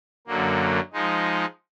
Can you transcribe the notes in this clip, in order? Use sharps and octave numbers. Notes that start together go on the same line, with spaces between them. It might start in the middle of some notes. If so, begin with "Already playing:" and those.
F#2 D3 F#3 A#3
F3 G#3 D#4